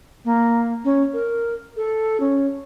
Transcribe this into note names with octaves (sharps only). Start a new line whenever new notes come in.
A#3
C#4
A#4
A4
C#4